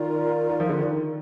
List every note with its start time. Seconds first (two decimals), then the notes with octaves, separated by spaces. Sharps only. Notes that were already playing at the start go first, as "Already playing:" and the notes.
Already playing: D#3 F4 A#4 D5
0.49 D#3
0.60 F3
0.69 D3
0.78 D#3